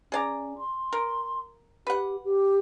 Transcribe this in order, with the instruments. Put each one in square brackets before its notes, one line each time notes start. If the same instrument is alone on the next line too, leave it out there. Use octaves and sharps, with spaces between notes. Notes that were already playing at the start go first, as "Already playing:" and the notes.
[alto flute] C#4 [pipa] G#4 D5 A#5
[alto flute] C6
[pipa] A#4
[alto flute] G4 [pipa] B4 F#5
[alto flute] G4